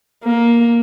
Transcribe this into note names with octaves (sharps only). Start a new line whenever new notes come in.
A#3